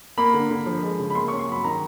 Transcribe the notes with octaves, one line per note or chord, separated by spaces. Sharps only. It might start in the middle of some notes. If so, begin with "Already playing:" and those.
A#3 B5
D3
D3
F3
G#3
C#3
B5
A#3 C6
C#4 C#6
C6
F#3 B5
D#3 A#5